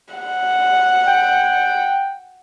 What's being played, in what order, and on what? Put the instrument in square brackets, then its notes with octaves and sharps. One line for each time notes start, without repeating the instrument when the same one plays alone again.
[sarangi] F#5
[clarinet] G5